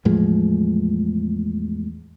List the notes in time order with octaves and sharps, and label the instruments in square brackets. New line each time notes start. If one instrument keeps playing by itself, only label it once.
[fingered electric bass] E2 A2 F3 G#3